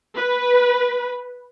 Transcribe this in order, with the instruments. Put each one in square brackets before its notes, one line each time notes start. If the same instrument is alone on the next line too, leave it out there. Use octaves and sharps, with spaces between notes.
[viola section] B4